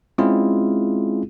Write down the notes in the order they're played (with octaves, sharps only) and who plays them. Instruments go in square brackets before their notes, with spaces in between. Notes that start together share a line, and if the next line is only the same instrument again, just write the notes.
[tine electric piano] G#3 C4 C#4 E4 F4 G#4